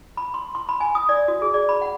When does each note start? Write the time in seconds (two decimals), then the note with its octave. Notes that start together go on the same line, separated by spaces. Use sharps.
0.17 B5
0.34 C6
0.55 C6
0.69 B5
0.80 G#5
0.95 D#6
1.09 D5
1.28 F#4
1.42 G#4
1.54 D5
1.69 B5
1.82 F#5